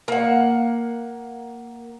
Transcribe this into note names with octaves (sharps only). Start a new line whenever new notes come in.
A#3 F#5